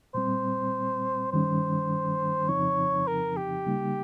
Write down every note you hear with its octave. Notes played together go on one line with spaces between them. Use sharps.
A#2 G3 C4 C5
G2 D#3 G3 C#4 C5
F2 C#3 F3 C4 D#4 C#5
A#4
G4
C#3 G3 A#3 D#4